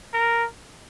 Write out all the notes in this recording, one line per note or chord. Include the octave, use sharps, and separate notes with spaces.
A#4